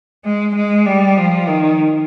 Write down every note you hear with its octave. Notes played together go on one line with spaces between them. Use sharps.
G#3
G#3
G3
F3
D#3